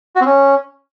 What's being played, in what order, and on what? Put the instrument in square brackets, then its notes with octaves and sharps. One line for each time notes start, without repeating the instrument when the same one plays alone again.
[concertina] F#4
C4
C#4